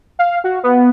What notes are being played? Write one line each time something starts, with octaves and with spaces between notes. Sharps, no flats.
F5
F#4
B3